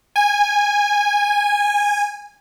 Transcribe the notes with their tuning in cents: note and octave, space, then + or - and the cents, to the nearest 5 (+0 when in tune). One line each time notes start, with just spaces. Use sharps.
G#5 -15